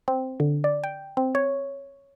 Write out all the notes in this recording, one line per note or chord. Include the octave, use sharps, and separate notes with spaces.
C4
D3
D5
G5
C4
C#5